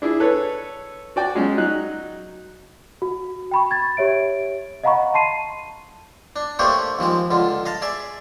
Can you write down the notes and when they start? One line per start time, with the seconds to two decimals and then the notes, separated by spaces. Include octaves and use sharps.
0.02 D4 E4 G#4
0.20 A4 B4 C#5
1.16 F#4 D5 G5
1.35 F#3 G#3 C#4
1.57 F#3 D#4 F#6
3.02 F#4
3.51 G5 B5 C#6
3.71 G#6 A6
3.97 G4 C#5 E5 D7
4.83 D#5 F5 F#5 A#5 B5 C#6
5.14 A5 C6 C7 D#7
6.36 D4
6.59 A3 A#3 D4 G4 C5 C#5
6.99 D#2 F3 G#3 D#6
7.31 C#2 D3 F4
7.66 D#5 F5 A5
7.82 G#4 D5 E5